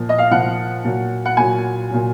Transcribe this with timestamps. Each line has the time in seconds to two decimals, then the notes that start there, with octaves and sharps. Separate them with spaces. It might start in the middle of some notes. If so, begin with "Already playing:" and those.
Already playing: A#2 F3
0.09 D#5
0.18 F5
0.31 A#2 F3 F#5
0.85 A#2 F#3
1.25 F#5
1.37 A#2 F#3 G#5
1.91 A#2 F#3